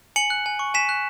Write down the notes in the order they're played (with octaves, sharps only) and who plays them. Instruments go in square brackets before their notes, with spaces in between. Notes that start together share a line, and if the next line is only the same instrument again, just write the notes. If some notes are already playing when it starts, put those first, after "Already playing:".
[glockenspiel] G#5 C#7 F#7
F#6
G#5
C#6
G#5 B6 E7
F#6